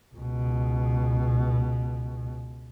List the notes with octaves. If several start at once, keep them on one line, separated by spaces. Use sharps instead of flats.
C#2 B2